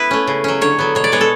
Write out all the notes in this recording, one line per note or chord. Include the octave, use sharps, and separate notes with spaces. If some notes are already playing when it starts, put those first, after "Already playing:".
Already playing: B3 E4 B4
A3 C#4
C#3
F#3 C#4
D3 C#5
F#3 B3
B2 C#5
D5
G#3 B3 C#5
A4